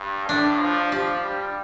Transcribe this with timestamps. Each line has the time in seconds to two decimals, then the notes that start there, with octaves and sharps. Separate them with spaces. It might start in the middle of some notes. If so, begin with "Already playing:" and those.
Already playing: G2
0.28 A2 D4
0.60 F3
0.92 F3 G4
1.23 G3